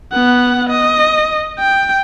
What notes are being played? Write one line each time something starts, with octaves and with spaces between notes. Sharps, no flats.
B3 F#5
D#5
G5